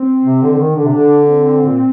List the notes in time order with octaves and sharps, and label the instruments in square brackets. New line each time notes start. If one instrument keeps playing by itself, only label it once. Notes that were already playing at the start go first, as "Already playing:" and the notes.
Already playing: [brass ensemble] C4
[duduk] C3
D3
D3
D#3
[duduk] D3 [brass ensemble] D4
[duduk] C3
D3
[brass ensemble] C4
[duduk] A#2